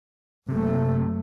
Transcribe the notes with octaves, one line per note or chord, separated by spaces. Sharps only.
F#1 C3 A3